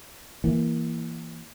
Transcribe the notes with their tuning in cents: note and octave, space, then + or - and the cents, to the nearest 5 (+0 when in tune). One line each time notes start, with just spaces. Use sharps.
E3 +0 A#3 +0